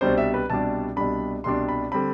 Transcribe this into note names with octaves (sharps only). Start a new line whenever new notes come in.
C2 B2 G3 D4 C5
E5
B4
C2 B2 G3 D4 A5
C2 B2 G3 D4 B5
C2 B2 G3 D4 C6
B5
D3 G3 C4 B5